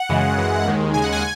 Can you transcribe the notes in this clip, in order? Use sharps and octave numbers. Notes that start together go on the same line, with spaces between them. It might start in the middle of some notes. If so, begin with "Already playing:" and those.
Already playing: F#5
F#2 C#3 E3 G#3
F#2 E3 G#3
D#2 D#3 G#3
D#2 C#3 G#3 G#5
F#5
G#5